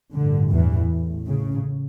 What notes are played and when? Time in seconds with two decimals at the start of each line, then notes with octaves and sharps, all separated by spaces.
0.14 A1 G2 D3
0.51 E2 E3
0.89 A1 A2
1.27 C#3